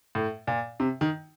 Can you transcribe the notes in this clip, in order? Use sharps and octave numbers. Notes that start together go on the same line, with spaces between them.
A2
A#2
C3
D#3